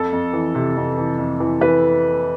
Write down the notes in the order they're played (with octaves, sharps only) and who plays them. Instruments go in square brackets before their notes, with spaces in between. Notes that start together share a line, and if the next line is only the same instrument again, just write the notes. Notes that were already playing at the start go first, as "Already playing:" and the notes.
Already playing: [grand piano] F2 A4
F2
E3
C3
F2
E3
F2
E3
E3 B4